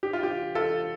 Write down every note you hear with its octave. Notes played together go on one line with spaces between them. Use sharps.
G4
F4
G4
F4 A4